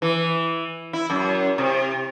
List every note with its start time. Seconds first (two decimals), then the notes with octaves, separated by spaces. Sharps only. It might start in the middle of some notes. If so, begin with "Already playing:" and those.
0.02 E3
0.93 E4
1.10 F#2
1.58 C3